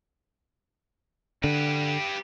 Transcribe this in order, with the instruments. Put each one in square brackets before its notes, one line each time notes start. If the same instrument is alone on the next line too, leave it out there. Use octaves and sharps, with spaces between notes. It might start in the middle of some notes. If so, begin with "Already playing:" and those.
[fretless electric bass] D3 [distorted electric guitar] G4 B4